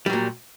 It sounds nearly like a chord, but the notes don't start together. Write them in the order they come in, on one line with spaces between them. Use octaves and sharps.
G3 F#3 A#2